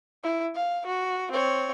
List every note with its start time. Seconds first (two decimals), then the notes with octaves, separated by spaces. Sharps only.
0.23 E4
0.55 F5
0.86 F#4
1.32 C4 C#5